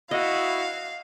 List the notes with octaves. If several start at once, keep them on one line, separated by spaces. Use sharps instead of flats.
E4 F#4 D#5 F5